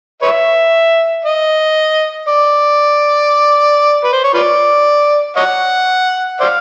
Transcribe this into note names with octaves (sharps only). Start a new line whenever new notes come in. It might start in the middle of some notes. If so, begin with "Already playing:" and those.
B4 C#5 E5
D#5
D5
B4
C5
C#5
F4 B4 D5
C#5 D#5 F#5
C5 D5 F5